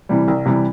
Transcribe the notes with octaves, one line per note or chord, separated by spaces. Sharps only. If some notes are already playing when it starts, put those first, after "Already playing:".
C3 E3 G3
C2
C3 E3 G3